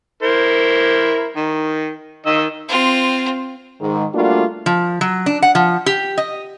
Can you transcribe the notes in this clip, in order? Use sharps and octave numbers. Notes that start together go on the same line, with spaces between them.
E4 A#4 C5
D#3
D#3 D#5 E6
C4 F4
G#2 D#3 G#3
G3 A3 A#3 D4 F4 F#4
F3
F#3
D4
F#5
F3
G4
D#5